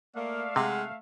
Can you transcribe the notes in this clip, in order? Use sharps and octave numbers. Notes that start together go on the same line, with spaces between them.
A3 A#3 D5 E5 F5
C3 G#3 F#5